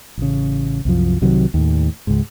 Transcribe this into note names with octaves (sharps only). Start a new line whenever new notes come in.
A1 C#3
C2 F#2 F3
C2 C3 D#3 F#3
D#2 A2
C#2 G#2